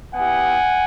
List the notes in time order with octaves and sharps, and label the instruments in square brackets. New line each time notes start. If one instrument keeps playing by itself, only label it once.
[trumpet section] B3 E4 G4 F#5 G#5